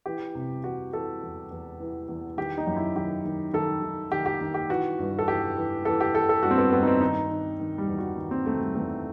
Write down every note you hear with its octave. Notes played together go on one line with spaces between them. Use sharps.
E3 G4
C3
E3 F#4
E3 A4
E2
E2
E3
E2
D#3 G4
D#4
F#2
E4
D#3 G4
D#3
D#3 A4
D#3
D#3 G4
G4
D#3
G4
E3 F#4
G2
A4
E3 G4
E3
E3 A4
G4
E3 A4
A4
G2 F#4
C4
B3
G2 B3
D#4
C4
D#3 D#4
D#3
D#3
G3
E2
F#4
D#3
C4
D#3 A3
G3
E2 A3